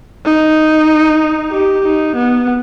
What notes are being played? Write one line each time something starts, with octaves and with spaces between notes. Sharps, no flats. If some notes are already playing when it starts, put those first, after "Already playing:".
D#4
G4
D#4
B3